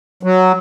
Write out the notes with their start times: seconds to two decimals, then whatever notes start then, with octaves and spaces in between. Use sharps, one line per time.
0.23 F#3